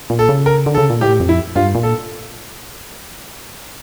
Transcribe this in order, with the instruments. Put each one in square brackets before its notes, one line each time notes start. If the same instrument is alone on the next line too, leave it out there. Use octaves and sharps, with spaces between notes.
[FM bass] A#2
[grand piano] A4
[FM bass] C#3
[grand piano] A#4
[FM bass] D3
[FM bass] C#3 [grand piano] A4
[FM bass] A#2
[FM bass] A2 [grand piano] G4
[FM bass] F2
[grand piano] E4
[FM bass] G2 [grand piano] F4
[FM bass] A#2
[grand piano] A4